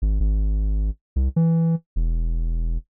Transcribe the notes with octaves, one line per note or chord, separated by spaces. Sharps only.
G#1
G#1
C2
E3
E1